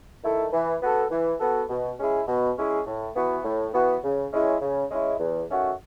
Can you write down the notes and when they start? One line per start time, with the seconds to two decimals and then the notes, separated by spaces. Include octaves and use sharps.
0.23 D#3 A3 E4 A4
0.53 E3
0.81 B3 F#4 A4
1.10 E3
1.40 B3 F#4 A4
1.69 B2
1.98 G#3 C#4 E4 G#4
2.28 B2
2.57 G#3 C#4 E4 G#4
2.86 A2
3.15 E3 B3 F#4
3.45 A2
3.74 E3 B3 F#4
4.03 C#3
4.32 G#3 C#4 E4
4.61 C#3
4.90 G#3 C#4 E4
5.20 E2
5.49 D#3 A3 C#4 F#4